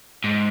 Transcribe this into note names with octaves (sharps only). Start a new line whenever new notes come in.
G#2